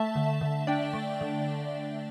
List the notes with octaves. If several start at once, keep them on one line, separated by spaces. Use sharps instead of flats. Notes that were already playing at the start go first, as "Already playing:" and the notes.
Already playing: A3 E5 A5
D3
D3
D4 D5 G5
A3
D3